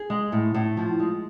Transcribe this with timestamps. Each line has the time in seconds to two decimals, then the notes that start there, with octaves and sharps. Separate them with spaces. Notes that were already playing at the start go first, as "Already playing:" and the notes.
Already playing: G#4
0.10 G#3
0.32 A2
0.54 A2
0.77 F3
1.00 G#3